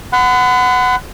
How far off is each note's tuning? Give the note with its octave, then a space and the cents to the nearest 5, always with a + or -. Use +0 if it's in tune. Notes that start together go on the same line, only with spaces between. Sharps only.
F#5 +0 B5 +40